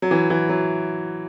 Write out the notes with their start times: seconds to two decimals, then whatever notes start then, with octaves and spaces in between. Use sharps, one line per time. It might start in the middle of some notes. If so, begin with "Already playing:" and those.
0.02 F#3
0.11 E3
0.30 E3
0.49 F#3